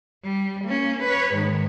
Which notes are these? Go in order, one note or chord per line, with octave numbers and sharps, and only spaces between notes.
G3
A#3 C#4
B4 C#5
G#2 D#3